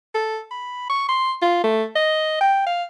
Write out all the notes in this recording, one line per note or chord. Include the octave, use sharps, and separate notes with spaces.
A4
B5
C#6
C6
F4
A3
D#5
G5
F5